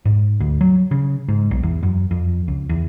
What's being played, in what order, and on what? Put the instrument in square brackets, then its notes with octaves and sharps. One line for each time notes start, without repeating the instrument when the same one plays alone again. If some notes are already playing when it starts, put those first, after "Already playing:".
[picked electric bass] G#2
D2
F#3
C#3
G#2
B1
E2
F#2
F2
C#2
E2